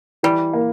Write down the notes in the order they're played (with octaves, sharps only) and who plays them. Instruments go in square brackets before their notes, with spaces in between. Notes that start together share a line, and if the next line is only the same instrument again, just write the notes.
[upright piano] E3 [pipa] G3
[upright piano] A#3